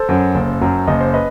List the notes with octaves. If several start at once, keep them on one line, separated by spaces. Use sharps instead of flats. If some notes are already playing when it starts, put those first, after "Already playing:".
Already playing: A4 C5
F#2 F#3
F#1
F#2 F#3
F#1 D#5
C5
B4 D#5